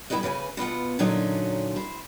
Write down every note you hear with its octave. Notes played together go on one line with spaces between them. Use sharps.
G3 B3 E4 G4 B4 D#5
C#3 B4 D5 G#5
B2 B3 F4 F#5
A#2 D3 F#3 C#4 D#4 F4
E4 C5